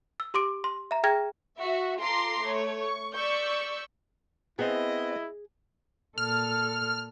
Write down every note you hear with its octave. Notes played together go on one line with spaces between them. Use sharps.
E6
G4 C6 D6 D7
C6
E5 A#5
G#4 G5 A#5 F6 G#6 A#6
F#4 E5
F4 A4 A#5 C6 D6 C7
A3 C#5
C#6
D5 C#6 E6 G6 B6 C#7
B3 C4 E4 G#4 D#5
A#2 A4 F6